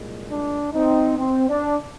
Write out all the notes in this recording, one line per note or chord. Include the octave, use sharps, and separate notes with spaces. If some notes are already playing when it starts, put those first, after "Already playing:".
Already playing: C2 A#2 G#3
D4
C4 D#4
C4
D4